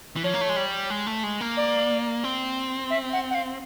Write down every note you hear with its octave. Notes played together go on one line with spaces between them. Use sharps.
E3
F3 C#5
A#3
A3
G#3
G3
G#3
A3
G#3
A#3
D5
C4
E5
F#5
F#5
F5